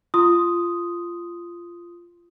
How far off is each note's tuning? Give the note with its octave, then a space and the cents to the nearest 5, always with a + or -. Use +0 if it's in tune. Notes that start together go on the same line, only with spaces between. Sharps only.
F4 -15 C6 +0 D#6 +0